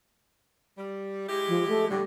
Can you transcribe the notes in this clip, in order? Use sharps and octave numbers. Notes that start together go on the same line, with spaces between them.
G3
G#3 E4 G4
F3
A3
A2 D3 G3